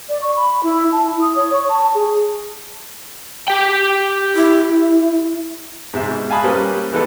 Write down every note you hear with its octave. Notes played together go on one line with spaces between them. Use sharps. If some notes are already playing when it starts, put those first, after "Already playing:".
D5
C#6
B5
E4
A5
E4
D#6
C#5
C#6
A5
G#4
G4 G5
E4
G#2 C3 E5
B2
F5 G#5 A5 B5 D#6 F#6
G3 A#3 C#4 G4 B4 C5
E3 G#3 A#3 B3 D#4 A4